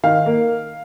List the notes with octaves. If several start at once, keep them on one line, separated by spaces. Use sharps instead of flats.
D#3 F5
A#3